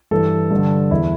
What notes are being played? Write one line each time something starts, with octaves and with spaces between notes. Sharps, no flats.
G2 E3 A4
G2 D3
E2 E3 E4